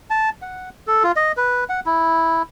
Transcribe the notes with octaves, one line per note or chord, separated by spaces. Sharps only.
A5
F#5
A4
F4
D#5
B4
F#5
E4